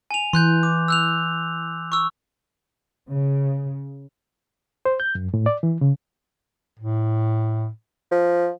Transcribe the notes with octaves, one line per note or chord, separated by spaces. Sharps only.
G#5 F7
E3 C6 F#6 G6
D6
E6 F#6 F7
C#6 E6
C#3
C5
G6
F#2
A2
D5
E3
C#3
A2
F3